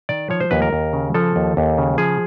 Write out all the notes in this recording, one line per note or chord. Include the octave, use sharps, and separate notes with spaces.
D#3 D5
F3 C#5
C5
D#2 B4
A#4
D#2
C#3
F3 A4
D#2
D#2
C#3
F3 G#4